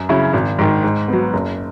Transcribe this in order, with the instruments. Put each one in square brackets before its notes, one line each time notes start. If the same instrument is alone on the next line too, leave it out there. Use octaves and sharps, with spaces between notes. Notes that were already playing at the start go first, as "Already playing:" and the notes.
Already playing: [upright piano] F#2
C#3 F#3 C#4 E4
G#1
G#2 D#3
G#2
F#3 B3
F#1